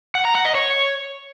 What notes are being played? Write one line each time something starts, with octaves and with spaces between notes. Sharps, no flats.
F#5
A#5
F#5
D#5
C#5